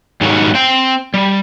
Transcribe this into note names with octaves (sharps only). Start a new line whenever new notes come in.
G#2 D#3 F#3 G3 C#4
C4 G5
G3